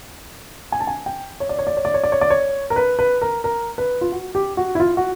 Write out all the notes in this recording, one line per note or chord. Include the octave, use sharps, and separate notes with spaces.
G#5
A5
G#5
G5
C#5
D5
C#5
D5
C#5
D5
C#5
D5
C#5
D5
C#5
A#4
B4
B4
A#4
A#4
B4
F4
F#4
G4
F#4
E4
F4
F#4